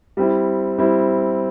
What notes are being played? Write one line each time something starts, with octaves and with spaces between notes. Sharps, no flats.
G3 C4 E4
G3 C4 E4